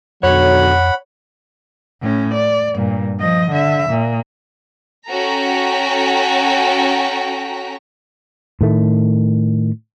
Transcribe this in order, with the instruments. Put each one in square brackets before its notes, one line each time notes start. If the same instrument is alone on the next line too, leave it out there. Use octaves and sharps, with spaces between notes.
[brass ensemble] B1 D3 F#3 [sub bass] F2 [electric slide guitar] C#5 [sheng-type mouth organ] F#5 B5
[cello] A2 C#4
D5
G2 A#2
F3 D#5
D3 E5
A#2
[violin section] C#4 F#4 A4 G5 A#5 B6
[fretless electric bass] A2 D#3 A3